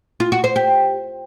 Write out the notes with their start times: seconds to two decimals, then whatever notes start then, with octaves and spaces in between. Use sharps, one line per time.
0.20 F4
0.32 F#4
0.44 C5
0.56 G4